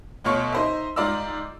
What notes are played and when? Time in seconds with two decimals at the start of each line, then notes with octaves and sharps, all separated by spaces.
0.24 D2 B2 F4 C#5 C#6
0.52 D#4 C5 E5
0.96 G#2 F4 D5 A#5 E6